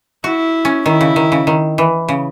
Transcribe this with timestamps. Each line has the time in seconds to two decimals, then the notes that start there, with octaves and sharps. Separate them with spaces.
0.24 E4 F#4
0.65 C#4
0.86 D#3 E4
1.01 C#3
1.16 D#3
1.32 C#3
1.47 D#3
1.78 E3
2.09 C#3